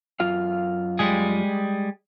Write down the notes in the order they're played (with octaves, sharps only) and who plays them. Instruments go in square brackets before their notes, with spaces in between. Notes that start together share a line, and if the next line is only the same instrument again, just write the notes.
[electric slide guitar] F#2 F4 F5
[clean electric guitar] G3 G#3 G#4